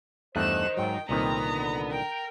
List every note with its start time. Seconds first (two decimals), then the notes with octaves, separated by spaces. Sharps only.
0.36 E2 G2 D#3 A3 C5 F#6 E7
0.77 G#2 F#3 G5
1.09 C2 A#2 D#3 G#3 A3 B3 C4 A#5
1.45 D3
1.91 A#4 G5